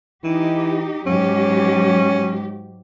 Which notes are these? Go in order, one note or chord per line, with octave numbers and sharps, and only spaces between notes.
E3 D#4 G4
G#2 F#3 C#4 G4